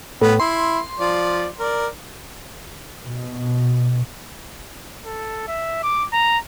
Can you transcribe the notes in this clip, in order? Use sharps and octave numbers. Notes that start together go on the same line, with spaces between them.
A2 B3
E4 C6
F3 D5
A#4 D5
B2
A4
E5
D6
A#5